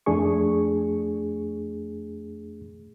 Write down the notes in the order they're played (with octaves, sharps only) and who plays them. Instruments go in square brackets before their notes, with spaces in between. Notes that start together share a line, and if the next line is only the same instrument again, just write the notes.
[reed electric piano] F2 A3 D4 G#4 C#6